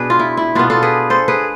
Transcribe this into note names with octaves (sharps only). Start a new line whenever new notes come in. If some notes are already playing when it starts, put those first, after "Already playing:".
Already playing: B2 B3 D4 G#4 B4
F4
E4
E4
B2 B3 D4 F4
F4 A4
G#4 B4
A4 C5
G#4 B4